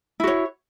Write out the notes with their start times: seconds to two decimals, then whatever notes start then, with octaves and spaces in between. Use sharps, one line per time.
0.20 E4
0.24 F#4
0.27 C#5